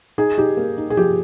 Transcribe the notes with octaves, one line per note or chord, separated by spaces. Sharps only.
D#4 G#4
D#4 G4
A#3
D#4
G#4
F3 G4